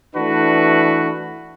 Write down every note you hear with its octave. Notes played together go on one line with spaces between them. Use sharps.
E3 A3 D4 F#4 B4